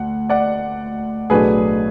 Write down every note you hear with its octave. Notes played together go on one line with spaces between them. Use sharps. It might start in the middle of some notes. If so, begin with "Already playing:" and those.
Already playing: D2 F#5
D5 F#5
B1 A2 F#3 A3 D4 G#4 B4